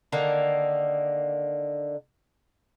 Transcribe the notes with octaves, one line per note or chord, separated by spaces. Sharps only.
D3 D#3 A#3